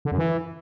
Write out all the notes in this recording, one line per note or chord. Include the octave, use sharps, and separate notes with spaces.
D3
F#2
E3